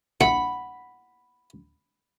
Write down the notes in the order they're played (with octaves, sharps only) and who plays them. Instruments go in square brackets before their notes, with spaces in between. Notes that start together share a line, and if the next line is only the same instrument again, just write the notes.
[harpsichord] A#1 G2 E4 [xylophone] F#5 [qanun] B5